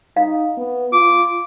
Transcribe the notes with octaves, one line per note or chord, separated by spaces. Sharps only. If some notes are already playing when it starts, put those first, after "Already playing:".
D#4 F5
B3
F4 D6